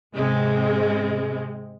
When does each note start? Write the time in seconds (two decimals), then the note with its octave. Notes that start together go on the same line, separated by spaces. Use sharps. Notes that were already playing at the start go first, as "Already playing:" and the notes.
0.15 G#2 C3 G#3 C4